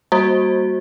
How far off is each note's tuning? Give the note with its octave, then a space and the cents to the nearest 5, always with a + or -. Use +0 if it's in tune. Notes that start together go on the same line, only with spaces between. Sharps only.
G3 +0 A#3 +0 F#4 +0